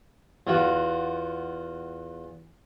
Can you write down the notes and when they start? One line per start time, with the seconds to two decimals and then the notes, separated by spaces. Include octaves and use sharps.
0.47 E2 F4 F#4